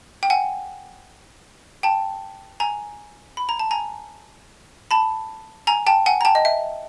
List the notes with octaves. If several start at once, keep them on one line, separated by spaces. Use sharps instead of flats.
G5
F#5 G#5
G5 A5
G#5 A#5
B5
A#5
A5
G#5 A#5
A5 B5
G#5 A#5
G5 A5
F#5 G#5
A#5
G5 A5
D#5
E5